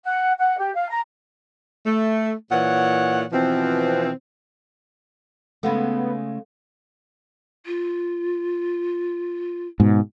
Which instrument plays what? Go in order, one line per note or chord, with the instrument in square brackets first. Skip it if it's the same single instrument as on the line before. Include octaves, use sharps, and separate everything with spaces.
[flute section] F#5
F#5
G4
F5
A#5
[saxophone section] A3
A#2 E3 C#5 F#5
B2 E3 F3 C4
[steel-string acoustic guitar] C#3 G#3 A3 [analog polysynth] B3 [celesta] A4 F5
[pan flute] F4
[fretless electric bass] G#2 B2